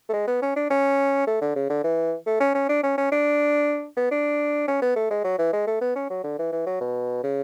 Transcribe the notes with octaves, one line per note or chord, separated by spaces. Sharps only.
A3
G#3
B3
C#4
D4
C#4
A3
D3
C#3
D3
E3
A3
C#4
C#4
D4
C#4
C#4
D4
B3
D4
C#4
B3
A3
G#3
F#3
E3
G#3
A3
B3
C#4
F#3
D3
E3
E3
F#3
B2
C#3